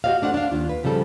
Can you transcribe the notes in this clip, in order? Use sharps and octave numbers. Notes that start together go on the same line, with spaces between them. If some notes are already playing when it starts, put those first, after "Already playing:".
F#4 G4 D5 D#5 F5
A3 D4 C5 F#5
D4 F5
D#2 F4
B4
G#2 C#3 F3 G3 A4